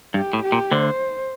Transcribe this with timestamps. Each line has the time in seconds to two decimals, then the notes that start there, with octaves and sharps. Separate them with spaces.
0.14 G2 G4
0.33 A2
0.43 G4
0.52 A#2
0.71 D2 D3 C5